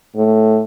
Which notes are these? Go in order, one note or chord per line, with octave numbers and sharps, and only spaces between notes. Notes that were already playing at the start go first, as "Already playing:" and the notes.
A2